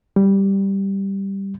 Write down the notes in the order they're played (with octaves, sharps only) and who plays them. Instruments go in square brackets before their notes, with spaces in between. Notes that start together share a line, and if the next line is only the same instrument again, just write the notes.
[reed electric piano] G3